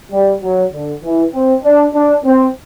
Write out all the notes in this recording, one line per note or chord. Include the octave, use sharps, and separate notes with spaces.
G3
F#3
D3
E3
C4
D4
D4
C4